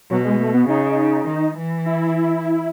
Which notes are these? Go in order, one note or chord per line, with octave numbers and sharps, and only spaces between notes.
B2 F#3
G#3
A3
B3
C#3 D#4
D#3
E3
E4